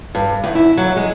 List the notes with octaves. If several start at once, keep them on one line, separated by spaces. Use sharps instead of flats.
G2
E2
E4
F#3
G#3